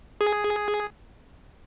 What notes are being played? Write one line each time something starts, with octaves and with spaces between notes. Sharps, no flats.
G#4